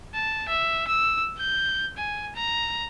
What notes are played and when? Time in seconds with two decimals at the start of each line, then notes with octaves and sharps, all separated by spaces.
0.14 A5
0.48 E5
0.87 E6
1.38 G6
1.97 G#5
2.36 A#5